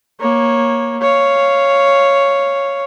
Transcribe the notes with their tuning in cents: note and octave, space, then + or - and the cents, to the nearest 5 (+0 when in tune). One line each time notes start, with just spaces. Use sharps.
A#3 +10 C#5 -10
C#5 +0 F5 -10